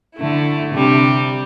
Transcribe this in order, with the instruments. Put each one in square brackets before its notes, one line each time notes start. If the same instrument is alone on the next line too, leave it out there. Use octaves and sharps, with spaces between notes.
[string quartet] D3 A3 E4
C3 G3 D4